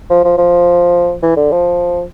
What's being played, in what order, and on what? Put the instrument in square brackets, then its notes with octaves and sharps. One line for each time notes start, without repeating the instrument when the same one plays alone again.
[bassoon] F3
F3
F3
E3
D3
F3